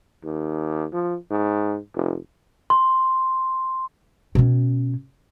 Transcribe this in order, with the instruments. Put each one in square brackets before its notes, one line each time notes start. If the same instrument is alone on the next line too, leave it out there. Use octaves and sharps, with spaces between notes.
[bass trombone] D#2
F3
G#2
F1
[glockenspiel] C6
[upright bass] B2 C#4